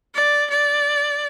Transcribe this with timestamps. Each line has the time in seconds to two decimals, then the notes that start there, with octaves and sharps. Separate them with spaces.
0.15 D5
0.50 D5